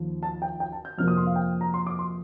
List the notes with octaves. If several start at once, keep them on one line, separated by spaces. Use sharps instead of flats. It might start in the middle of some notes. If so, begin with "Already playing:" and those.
Already playing: D#2 F3
A5
G5
G5
A5
G6
F2 C3 F3 A#3 F6
D#6
C6
F5
G5
A#5
C6
D6
C6